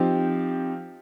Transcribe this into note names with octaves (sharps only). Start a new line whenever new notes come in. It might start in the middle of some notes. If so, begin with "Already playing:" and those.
Already playing: F3 C4 D#4 G4